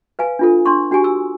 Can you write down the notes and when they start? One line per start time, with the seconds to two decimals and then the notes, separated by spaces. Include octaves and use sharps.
0.19 B4 F5 G#5
0.39 D4 F4 A4
0.66 D4 C6 C#6
0.91 D4 F#4 G4 G#5 C#6
1.04 E6